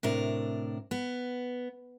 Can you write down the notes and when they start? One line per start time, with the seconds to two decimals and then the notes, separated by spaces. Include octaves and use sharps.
0.03 A2 C3 D4 A#4
0.91 B3